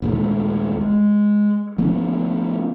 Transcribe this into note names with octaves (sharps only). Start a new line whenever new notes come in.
A#1 D#2 G#3 A3
G#3
F3 A3 B3 C#4